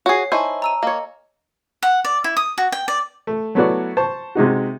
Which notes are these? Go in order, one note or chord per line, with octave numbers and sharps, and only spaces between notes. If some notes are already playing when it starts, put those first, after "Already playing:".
F#4 G#4 C#5 C7
D#4 E4 C5 G#5 A5 C#6
A#5 E6 D#7
A#3 C#5 D#5
F#5
D5
E4
D#6
F#4
G5
D5
A3
F#3 A3 B3 E4 F#4 D5
C5 A5 C#6
C3 G#3 D#4 F#4